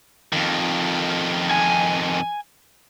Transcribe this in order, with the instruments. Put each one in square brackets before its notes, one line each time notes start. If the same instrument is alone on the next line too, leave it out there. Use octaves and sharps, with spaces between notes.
[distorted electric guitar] F2 D#3
[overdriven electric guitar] G#5